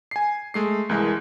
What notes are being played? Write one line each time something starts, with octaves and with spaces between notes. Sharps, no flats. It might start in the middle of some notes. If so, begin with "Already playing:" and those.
G#5 C7
G#3 A3 C7
C2 E3 G#3 A#4